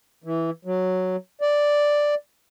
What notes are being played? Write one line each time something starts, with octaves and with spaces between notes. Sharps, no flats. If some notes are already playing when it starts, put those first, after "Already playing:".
E3
F#3
D5